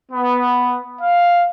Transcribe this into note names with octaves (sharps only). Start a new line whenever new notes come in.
B3
F5